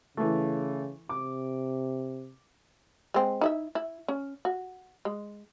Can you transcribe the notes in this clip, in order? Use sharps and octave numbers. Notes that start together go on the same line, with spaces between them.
C#3 E3 A3
C3 D6
G#3 C4
D#4 E4 E5
E4
C#4
F#4
G#3